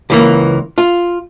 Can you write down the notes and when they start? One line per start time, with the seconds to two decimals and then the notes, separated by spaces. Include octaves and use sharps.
0.10 C#2 E3 A#3
0.78 F4